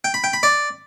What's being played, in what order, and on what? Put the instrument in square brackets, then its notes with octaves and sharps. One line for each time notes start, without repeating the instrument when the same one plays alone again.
[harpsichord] G5
B5
G5
B5
D5